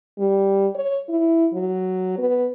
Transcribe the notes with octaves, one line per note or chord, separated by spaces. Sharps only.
G3
C#5
E4
F#3
B3